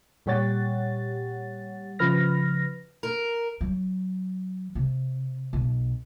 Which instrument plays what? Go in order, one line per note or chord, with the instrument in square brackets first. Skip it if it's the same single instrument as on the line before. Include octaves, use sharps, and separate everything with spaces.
[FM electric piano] A#2 G3 G4 C#5 F#5 A6
C#3 F3 B4 F6 A#6
[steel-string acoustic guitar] A#4
[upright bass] F#3
C3
B1